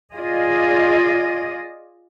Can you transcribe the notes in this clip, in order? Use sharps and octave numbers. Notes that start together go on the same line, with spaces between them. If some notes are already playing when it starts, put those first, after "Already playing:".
F4 G#4 D5 D#5